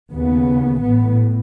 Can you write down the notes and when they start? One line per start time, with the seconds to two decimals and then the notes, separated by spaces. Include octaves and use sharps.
0.12 D#2 C#3 B3
0.82 A1 A2 B3